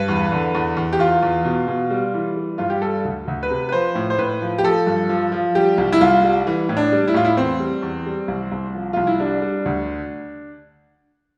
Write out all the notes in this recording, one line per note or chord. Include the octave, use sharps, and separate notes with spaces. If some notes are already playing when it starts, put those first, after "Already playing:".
Already playing: G2 B4
E2
D3
E2
E2
G4
E2 F4
E2
B2
B2
G3
E3
G3
G2 F4
G4
G3 A4
D2
D2
B4
C3
B4
F3 C5
A2
C5
A2 B4
F3
G4
F3 A4
G2
F3
F3
G3 G4
C2
E4
C2 F4
G3
E3
A2
D4
G3
E4
A2 F4
E4
E2 C4
G3
E2
G3
C2
C2
F3
C2 F4
E4
G3 D4
G3
D2